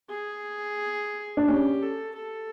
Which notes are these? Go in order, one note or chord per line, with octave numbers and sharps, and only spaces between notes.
G#4
D4
C#4 G4
A4
A4